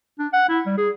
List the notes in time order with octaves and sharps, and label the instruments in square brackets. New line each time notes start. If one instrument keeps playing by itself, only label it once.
[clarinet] D4
F#5
E4
G3
G#4